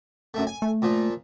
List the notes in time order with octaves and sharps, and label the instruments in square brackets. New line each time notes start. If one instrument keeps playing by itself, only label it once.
[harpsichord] F#2 A3
G#5
[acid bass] A3
[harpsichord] A#2 F3